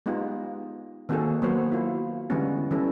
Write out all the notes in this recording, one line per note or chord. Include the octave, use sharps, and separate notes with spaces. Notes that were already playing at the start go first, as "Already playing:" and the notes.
G#3 B3 D#4 F4 G4
D#3 A#3 C4 F#4 G#4 A4
F#3 A#3 B3 A#4 C5 C#5
E4 F4
D3 E3 G3 G#3 B3 C#4
E3 G3 C#4 E4 A4